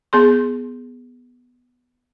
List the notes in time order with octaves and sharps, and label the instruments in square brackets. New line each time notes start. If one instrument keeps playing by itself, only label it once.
[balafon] B3 G#4 C6